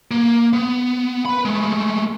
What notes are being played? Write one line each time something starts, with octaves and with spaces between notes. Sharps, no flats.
A#3
B3
B4 B5
G#3 A3